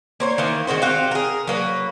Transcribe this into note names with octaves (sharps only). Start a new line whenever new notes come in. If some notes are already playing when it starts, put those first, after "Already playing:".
A#3 C5 C#5
D#3 E3 A#3
D#3 G#3 F#4 C5
C4 F#4 G4 F5
G#4 A#4
F#3 A#3 B4